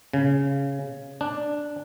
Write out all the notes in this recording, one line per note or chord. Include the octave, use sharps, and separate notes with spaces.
C#3
D4